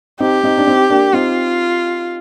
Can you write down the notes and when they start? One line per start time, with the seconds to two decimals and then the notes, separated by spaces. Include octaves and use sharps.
0.20 C4 D#4 G4
0.43 C4 D#4
0.58 D4
0.67 C4 D#4
0.90 A#3 D4
1.13 C4 D#4 F4